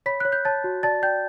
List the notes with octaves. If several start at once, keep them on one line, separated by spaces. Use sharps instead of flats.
C#5 B5 B6
C#5 F#6
G6
C#5 A5 A6
F#4
D5 A5 A6
D5 G5 G6